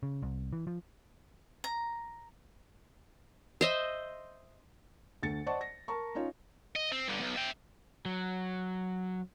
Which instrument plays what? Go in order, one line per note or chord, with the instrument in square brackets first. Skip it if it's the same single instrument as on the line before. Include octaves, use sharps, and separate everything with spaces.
[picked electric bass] C#3
C2
E3
F3
[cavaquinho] A#5
[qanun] C5 D#5 E5
[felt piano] D2 A3 A6 C#7
C5 D5 D#5 F#5 A5 C#6
A#6
A#4 A5 A#5 C#6
C#4 D#4 F4 C#5
[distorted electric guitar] D#5
C4
G2 D3
B1
E5 G5
[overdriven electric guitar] F#3